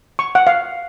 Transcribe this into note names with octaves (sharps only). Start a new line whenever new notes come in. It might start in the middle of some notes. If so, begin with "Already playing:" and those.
C#6
F#5
F5